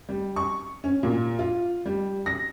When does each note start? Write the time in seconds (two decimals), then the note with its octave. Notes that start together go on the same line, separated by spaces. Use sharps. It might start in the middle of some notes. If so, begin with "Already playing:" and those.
0.09 G3
0.36 C#6
0.84 C#4
1.03 A#2
1.39 F4
1.86 G3
2.26 A#6